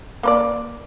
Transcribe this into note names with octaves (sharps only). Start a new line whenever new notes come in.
A#3 B4 D5